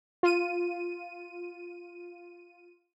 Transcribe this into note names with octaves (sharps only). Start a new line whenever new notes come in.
F4 D#7